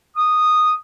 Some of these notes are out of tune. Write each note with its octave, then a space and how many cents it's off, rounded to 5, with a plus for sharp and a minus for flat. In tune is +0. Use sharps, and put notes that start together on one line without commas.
D#6 -10